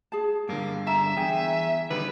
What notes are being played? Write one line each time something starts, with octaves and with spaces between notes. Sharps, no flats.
G#4 A5
G2 D3 A#3
E5 A#5
E2 G#4 G5
D3 D#3 G3 B4